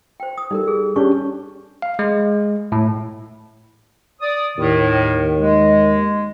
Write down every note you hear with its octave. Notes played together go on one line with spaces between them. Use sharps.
C5 G5
D#6
G3 D#4 A4 A#4
G#4
C#4 D4 G4 C#6
F5
G#3
A2
D5 D#6
D#2 A2 D#3
G#3